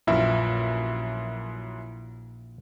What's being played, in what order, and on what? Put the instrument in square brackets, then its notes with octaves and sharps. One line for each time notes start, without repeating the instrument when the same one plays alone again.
[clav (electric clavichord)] A#1 E3 F4 [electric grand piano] F#2 E4 E5